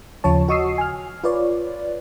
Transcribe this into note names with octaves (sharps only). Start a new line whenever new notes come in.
D#2 C#3 F3 F4 C#5 A5
F#4 D#5 C#6 D#6 E6 C7
G#5 F6
F4 B4 C#5 D5